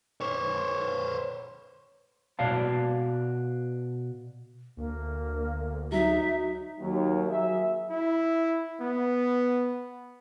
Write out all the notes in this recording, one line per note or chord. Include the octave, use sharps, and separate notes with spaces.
C5 C#5
B2 F#4 D5 F5 A5
D2 A#3
F#3 D#4 E5
D#2 F#3
F#3 A#3 G#4 E5
E4
B3